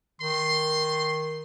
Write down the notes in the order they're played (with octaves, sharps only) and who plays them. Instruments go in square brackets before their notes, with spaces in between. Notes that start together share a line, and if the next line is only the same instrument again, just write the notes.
[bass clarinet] D#3 [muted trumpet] C6